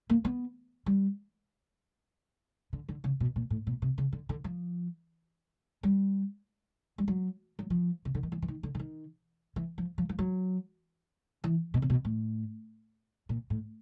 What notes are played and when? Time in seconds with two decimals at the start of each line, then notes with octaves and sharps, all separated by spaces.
0.10 A#3
0.25 B3
0.86 G3
2.73 D3
2.89 D3
3.04 C#3
3.20 B2
3.36 A#2
3.50 A2
3.67 B2
3.82 C3
3.98 C#3
4.13 D3
4.29 D3
4.44 F3
5.83 G3
6.98 G3
7.08 F#3
7.59 F#3
7.70 F3
8.05 C#3
8.15 D3
8.23 D#3
8.32 E3
8.42 E3
8.48 D#3
8.63 D3
8.75 D3
8.79 D#3
9.56 E3
9.78 F3
9.98 F3
10.09 F3
10.19 F#3
11.44 E3
11.74 B2
11.82 C3
11.90 B2
12.05 A2
13.29 A#2
13.50 A2